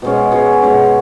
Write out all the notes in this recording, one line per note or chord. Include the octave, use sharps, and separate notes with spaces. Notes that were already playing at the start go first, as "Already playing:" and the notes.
B2 G#3 C#4
B2 G#3 C#4
B2 G#3 C#4